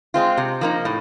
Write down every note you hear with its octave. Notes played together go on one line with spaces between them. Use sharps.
G#3 C4 F4
C3
F3 A#3 D#4
A2